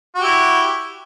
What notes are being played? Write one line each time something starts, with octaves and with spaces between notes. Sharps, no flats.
E4 F#4 G4